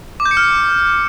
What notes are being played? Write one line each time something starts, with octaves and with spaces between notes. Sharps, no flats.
D6
G6
C#7
F6